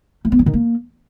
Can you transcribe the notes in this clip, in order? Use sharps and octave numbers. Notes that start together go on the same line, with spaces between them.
A3
B3
F#3
D#3
A#3